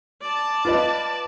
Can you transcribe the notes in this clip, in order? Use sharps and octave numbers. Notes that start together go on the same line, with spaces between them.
D5 A5
F4 B4 D#5